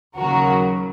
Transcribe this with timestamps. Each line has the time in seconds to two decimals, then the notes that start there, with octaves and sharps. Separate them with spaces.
0.17 D#2 C#3 F#3 F#4 A#4